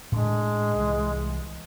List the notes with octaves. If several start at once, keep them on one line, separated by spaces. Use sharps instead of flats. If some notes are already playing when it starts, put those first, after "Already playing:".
A2 G#3 C#4 D4
C2 E3